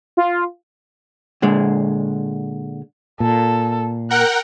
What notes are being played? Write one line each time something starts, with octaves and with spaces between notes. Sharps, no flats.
F4
A#2 D3 G#3
A#2 A4
A#4 F#5 G5 F#6